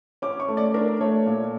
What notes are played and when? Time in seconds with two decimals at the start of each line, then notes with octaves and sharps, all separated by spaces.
0.22 C#4 D6
0.40 C#6
0.48 A3
0.57 D5
0.74 D4 A#4
1.01 A3 C#5
1.26 A#2